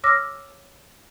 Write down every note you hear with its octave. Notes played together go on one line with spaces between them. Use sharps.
C#5 D6 E6 F6 A#6